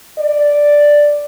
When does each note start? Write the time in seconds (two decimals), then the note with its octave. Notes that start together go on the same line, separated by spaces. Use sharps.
0.18 D5